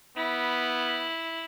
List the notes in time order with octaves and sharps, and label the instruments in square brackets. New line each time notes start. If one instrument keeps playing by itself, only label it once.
[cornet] B3 [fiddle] E4